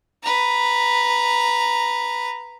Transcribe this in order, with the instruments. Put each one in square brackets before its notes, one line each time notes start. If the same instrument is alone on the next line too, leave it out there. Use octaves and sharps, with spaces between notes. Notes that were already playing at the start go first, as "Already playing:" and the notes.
[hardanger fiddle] B4 A#5